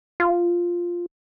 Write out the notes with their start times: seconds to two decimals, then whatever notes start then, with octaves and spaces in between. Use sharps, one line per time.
0.20 F4